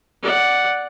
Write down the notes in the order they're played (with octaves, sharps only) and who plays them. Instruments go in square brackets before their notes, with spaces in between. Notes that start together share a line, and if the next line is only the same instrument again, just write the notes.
[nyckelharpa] D5 F#5